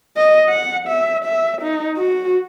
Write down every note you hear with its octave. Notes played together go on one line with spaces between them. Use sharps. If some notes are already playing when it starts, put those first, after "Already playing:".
D#5
F#5
E5
E5
D#4
F#4